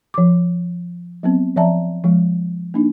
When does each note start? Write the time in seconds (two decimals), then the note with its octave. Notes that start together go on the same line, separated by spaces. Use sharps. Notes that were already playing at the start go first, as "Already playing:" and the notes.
0.14 F3 D6
1.23 F#3 B3 C4
1.56 F3 D5 E5 A5 A#5
2.04 F3 G#3
2.74 A#3 D4 D#4